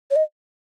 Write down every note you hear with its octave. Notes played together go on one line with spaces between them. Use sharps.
C#5
D#5